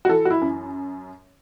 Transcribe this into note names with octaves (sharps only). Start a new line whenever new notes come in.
F#4
E3 A4
F#4
E4
F#2